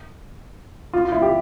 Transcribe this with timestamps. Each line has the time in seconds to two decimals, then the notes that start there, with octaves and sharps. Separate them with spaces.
0.93 F4
1.05 F4
1.12 E4
1.22 G4